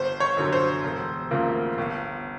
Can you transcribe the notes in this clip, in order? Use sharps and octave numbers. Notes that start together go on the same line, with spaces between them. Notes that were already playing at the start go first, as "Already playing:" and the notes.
Already playing: G1 C5
C#5
F#2 D3 F#3
C5
E1
D2 C#3 F3 A#3
G1